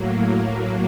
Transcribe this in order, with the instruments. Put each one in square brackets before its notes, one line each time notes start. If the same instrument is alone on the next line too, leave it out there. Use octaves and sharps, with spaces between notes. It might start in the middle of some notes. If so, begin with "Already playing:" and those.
Already playing: [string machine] A2 F#3 A#3